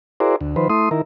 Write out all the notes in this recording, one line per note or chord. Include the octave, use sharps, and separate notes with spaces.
E4 F#4 G#4 A#4 C5 D5
D2
D#3 F3 B4 C5
A3 E4 C6 D#6
D#3 E4 A#4